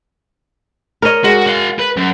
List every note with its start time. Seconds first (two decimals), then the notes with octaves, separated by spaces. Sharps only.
1.02 A#4 C#5 D#5
1.24 G#3 F#4
1.47 F#4 F5
1.79 B4
1.97 F#2